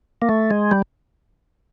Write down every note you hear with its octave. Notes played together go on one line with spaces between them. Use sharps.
A#3
A3
G#3
G3